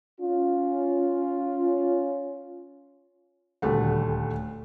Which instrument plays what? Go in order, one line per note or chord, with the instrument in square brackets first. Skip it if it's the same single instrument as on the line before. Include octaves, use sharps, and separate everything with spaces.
[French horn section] C#4 F4
[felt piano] D#1 D2 G3 A3 F#5